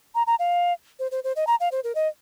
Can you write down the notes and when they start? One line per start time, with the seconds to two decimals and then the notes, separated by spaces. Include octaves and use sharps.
0.15 A#5
0.27 A#5
0.39 F5
0.99 C5
1.11 C5
1.24 C5
1.36 D#5
1.47 A#5
1.60 F5
1.72 C5
1.84 A#4
1.95 D#5